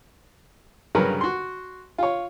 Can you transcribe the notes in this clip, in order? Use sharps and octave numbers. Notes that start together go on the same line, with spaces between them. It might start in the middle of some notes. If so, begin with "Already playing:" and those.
G2 C#3 F#3 A#4 B4
F#4 C6
F4 C#5